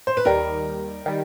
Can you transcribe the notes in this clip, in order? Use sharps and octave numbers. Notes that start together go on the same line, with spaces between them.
C5
B4
D#2 D#3 G3 A#4
D#3 G3